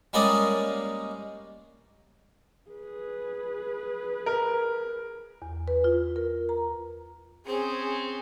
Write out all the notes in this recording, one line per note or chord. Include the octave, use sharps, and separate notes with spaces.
G3 G#3 A#3 C#4 D5 D#5
G#4 B4
A#4
E2
B4
F4
A#4
A#5
C4 C#4 G#4